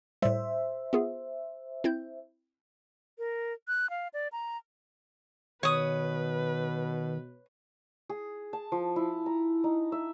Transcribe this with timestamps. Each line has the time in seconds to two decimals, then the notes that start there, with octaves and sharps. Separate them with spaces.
0.22 A2 G3 C5 E5
0.93 B3 F4 G#4
1.84 C4 E4 G6
3.18 A#4
3.68 F#6
3.90 F5
4.14 D5
4.32 A#5
5.63 B2 D#3 B4 C#5 D#6
8.09 G#4
8.53 A5
8.72 F3
8.96 E4
9.26 A#5
9.64 D#4
9.92 E5